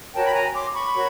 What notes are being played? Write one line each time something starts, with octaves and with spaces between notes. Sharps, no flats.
F#4 A#4 C#5 G5 A5
B5
G#5 A#5
C6 D6
B5 C#6
F#4 A#4 C#5